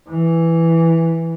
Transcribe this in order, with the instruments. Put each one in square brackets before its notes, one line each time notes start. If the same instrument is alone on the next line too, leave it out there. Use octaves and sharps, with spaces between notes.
[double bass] E3